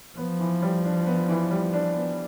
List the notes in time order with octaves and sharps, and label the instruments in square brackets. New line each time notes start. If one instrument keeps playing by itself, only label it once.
[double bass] F3 [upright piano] B3
[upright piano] E3
G3
D4
B3
E3
G3
D4
B3